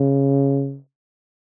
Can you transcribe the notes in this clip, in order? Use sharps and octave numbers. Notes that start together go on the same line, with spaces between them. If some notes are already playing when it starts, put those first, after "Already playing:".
Already playing: C#3